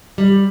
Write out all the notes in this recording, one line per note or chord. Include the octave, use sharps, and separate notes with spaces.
G3